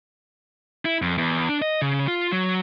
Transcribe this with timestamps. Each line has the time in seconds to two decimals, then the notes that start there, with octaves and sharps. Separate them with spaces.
0.85 E4
1.02 F2
1.18 E2
1.49 D4
1.62 D#5
1.82 C#3
2.08 F4
2.32 F#3